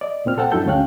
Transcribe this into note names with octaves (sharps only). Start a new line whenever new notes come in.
D5 D#5
C2 A#2 C4 F6
A4 C5 F#5 G5 A5
F#2 D4 E4 F#4 A4 G6
D2 G#3 C#4 F5 G5 F#6